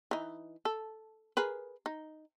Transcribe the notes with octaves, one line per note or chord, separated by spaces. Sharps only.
E3 D#4
A4
G#4 A#4 B4
D#4